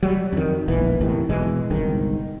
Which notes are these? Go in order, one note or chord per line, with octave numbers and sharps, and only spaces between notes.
F#3 G3
F2 D#3
E1 A#1 E3 B3
E2 A2 C3 D#3
E2 B2 E3 G#3
G1 C2 G#2 D#3